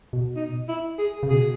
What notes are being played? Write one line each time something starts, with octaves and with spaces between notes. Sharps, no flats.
B2
D#4
E4
G#4
C#3
B2 G#4